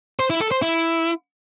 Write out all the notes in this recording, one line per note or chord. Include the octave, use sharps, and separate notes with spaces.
C5
E4
A4
C5
E4